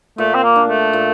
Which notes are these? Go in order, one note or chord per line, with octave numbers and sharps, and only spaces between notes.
A#2 A3
C4
A#3
D4
A3
A#2